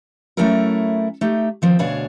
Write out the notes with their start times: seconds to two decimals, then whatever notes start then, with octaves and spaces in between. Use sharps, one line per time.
0.37 F#3 A3 C#4 E4 A4 A#4
1.21 A3 D#4 G4
1.62 D#3 F3 C4
1.79 D2 B2 D4 G#4 C#5 F5